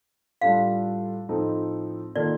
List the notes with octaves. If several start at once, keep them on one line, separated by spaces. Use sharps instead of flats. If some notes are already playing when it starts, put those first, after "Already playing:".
A2 G3 D4 F4 A4 F5
A2 F3 C4 D#4 A4
D#3 A#3 F4 A4 D5